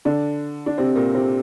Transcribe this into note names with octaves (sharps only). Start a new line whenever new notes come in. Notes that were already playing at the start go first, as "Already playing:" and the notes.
D3 D4
D4
C3 C4
A#2 A#3
C3 C4